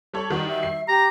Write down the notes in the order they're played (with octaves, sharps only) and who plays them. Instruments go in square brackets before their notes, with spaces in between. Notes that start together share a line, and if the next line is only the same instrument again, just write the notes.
[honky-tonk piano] G3 A4 C#5
[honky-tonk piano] D#3 G3 F#4 [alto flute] D#4
[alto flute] E5
[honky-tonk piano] C7
[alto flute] G4 [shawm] A#5